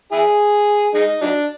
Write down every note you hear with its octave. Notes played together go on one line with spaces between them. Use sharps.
E4 G#4
G#3 D#4
F#3 D4